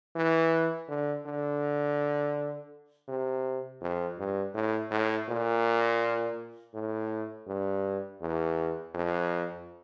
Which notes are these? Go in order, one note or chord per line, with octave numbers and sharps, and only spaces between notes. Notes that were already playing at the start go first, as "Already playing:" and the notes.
E3
D3
D3
C3
F2
G2
A2
A2
A#2
A2
G2
E2
F2